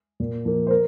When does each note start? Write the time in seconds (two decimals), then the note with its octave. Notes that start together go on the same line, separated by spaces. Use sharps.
0.20 A#2
0.45 F3 A#3
0.67 C5
0.71 A#4